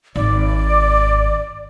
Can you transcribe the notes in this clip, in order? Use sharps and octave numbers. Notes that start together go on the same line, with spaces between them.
G#1 D5